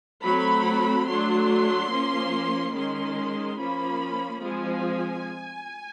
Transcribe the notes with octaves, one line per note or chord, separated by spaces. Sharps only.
F#3 A3 C4 B5
F#3 A3 D4 C6
F3 A#3 C#4
D#3 G#3 C#4 C6
F3 A#3 C#4 B5
F3 G#3 C4 G#5